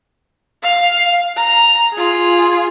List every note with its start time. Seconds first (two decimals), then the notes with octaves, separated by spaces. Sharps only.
0.63 F5
1.36 A#5
1.93 F4 G#4